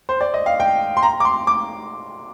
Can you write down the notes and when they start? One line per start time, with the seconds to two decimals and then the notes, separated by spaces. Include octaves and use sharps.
0.09 C5
0.21 D5
0.34 D#5
0.46 F5
0.60 G5
0.97 C6
1.03 A#5
1.20 D6
1.25 C6
1.47 D6